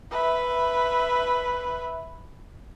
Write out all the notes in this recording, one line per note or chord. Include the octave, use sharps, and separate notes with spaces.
B4 E5